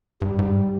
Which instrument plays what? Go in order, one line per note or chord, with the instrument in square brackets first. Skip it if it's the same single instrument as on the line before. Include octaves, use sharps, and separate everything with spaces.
[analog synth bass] G2 [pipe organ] G3
[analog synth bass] G#2